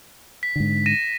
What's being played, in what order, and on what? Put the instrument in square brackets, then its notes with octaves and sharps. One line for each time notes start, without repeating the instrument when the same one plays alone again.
[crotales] B6
[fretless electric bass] G#2 D3
[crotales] A#6 D#7 E7